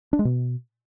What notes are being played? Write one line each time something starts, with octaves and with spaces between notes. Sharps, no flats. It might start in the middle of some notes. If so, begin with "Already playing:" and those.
D4
G#3
B2